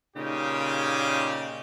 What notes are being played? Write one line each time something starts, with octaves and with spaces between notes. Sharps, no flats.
A#2 C#3 D#4 G4